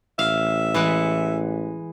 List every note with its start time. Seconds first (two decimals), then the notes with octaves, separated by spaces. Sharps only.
0.19 A1 E5 F5
0.74 E3 G#3 F#5